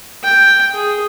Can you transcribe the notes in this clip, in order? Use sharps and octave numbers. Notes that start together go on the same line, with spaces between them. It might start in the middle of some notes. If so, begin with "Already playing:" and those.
G5
G#4